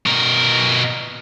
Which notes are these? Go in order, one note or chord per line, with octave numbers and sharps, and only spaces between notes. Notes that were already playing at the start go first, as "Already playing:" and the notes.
B2 A#4